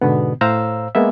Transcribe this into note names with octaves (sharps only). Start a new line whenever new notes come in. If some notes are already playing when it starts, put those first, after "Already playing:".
G#2 B2 D3 B3
A2 C5 F5 A#5 E6
G#3 A#3 B3 E5